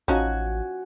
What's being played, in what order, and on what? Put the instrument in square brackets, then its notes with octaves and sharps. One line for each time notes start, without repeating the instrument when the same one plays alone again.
[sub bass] A1 [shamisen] F3 C#4 D#4 [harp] F#4 F#5 G#5